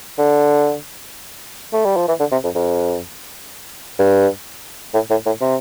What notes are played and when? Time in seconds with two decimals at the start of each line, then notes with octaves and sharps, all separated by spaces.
0.18 D3
1.73 A3
1.86 G3
1.96 F3
2.08 E3
2.20 D3
2.32 C3
2.44 F2
2.55 F2
3.99 G2
4.94 A2
5.10 A2
5.26 A2
5.41 C3